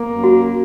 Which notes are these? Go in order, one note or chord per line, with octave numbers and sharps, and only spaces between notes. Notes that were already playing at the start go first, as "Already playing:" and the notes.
Already playing: A#3
F#2
F#4